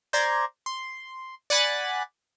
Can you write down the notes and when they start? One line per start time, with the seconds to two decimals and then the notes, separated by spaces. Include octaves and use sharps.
0.13 C5 D5 A#5 C6 G#6
0.66 C6
1.50 D5 F#5 G#5 B5 F#6 A6